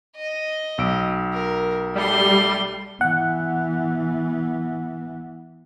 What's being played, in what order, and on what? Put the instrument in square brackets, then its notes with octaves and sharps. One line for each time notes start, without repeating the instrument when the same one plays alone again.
[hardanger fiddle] D#5
[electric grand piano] B1 E6 D7
[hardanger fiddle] A#4
[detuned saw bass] G3 [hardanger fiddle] A3 C6
[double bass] E3 B3 [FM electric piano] F#5